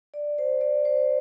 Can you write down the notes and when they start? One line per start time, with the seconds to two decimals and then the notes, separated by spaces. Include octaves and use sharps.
0.14 D5
0.38 C5
0.61 D5
0.85 C5